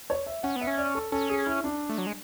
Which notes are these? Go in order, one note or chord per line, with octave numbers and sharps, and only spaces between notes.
C#5
E5
C#4 F#5
B3
E5
C#4
D5
A4
C#4 A4
G#4
E4
D4
A3
F#3
G#3